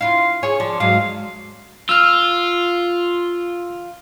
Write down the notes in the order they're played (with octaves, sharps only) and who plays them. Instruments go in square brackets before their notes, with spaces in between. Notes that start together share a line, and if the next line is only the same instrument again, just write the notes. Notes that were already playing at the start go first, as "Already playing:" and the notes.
[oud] E4 F4 [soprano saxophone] F5
[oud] G#4 [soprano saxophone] C#5
[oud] F3 [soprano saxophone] D4
[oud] G#2 F#3 G#3 [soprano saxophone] F5
[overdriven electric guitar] F4 [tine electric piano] E6 F6